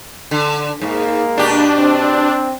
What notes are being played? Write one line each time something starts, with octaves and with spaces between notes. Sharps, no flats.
D3
G#2 G#3 A#3
B2 D4 G4
C4